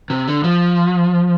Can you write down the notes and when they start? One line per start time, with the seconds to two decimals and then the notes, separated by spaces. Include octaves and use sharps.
0.10 C3
0.28 D3
0.44 F3